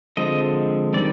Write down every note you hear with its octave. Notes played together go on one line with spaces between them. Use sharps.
D3 F3 G#3 C4 D#5
D#3 G3 C4 D5